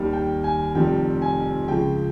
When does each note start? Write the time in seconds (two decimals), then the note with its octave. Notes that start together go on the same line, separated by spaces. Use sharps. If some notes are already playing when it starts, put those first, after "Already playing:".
Already playing: D#2 D#3 G3
0.13 G5
0.44 G#5
0.75 F1 F2 D#3 G3 G5
1.22 G#5
1.68 C#2 C#3 F3 G5